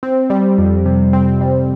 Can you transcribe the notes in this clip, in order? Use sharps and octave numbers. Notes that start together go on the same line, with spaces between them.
C4
G3
F2
C3
C4
G3